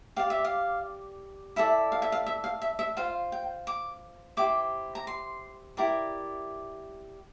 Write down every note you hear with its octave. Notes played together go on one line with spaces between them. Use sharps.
G4 D5 F5
E5
F5
E4 A4 D5 E5
F5
E5
F5
E5
F5
E5
E5
F4 C5 F5
G5
D6
E4 G4 C5 D6
A#5
C6
E4 G4 A#4 D5